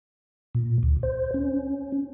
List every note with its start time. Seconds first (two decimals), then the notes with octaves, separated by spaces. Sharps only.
0.55 A#2
0.83 D2
1.03 C5
1.34 C#4